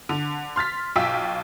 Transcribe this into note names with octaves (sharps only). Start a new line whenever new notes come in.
D3
C6 F6 A6 B6
B1 F4 G5 E6 B6